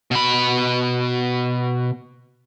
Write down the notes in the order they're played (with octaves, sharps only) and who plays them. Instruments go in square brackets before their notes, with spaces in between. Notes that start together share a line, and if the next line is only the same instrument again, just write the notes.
[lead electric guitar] B2 B5